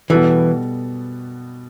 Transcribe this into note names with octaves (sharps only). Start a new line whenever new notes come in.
B2 E3 G3 B3 F#4 A4